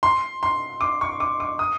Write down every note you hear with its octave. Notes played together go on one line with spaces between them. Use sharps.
C6
C6
D6
C#6
D6
D6
D#6